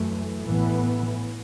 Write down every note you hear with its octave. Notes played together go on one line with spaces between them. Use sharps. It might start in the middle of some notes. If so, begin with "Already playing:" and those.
Already playing: F#2 E3 A3
A1 A2 E3 B3